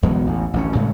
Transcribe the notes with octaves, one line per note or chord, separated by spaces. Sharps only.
B1 E2 B2 G#3
A1
A1 D2 F#3 C#4
A2 C#3 G#3 A3